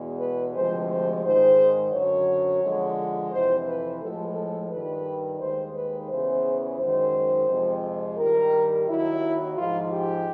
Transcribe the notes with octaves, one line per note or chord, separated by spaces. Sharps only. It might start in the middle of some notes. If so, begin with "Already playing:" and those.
Already playing: E2 B2 G#3
B4
D2 C3 F3 G#3 C5
C5
G#2 D#3 G#3 C5
F#2 D3 F#3 C#5
F2 D3 F3 G#3
F2 C3 E3 C5
B4
A2 F3 G#3 A4
A4
G2 D#3 G3 B4
D#2 D#3 G#3 C5
B4
E2 C#3 E3 C5
F#2 D#3 G#3 C5
F2 C3 F3 G#3
G2 D#3 G3 A#4
D#2 D#3 F#3 E4
G#2 F3 G#3 F4
G4